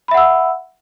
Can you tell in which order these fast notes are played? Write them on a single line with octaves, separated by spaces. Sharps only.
B5 E5 F#5 E6